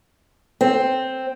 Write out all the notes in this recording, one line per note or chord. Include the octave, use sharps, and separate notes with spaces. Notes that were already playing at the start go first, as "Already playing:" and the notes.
C4